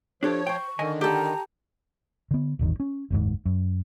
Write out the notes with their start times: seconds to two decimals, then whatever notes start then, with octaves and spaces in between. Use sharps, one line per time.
0.23 F3 D4 G4 A4 C#5
0.47 C5 G5 C#6
0.79 D3 D#3 D#5 G#5
1.01 G4 A4 A#5
2.31 D3 B3
2.59 D#1 G#1 E2 D#3
2.80 C#4
3.11 F#1 D#2 G#2
3.46 F#2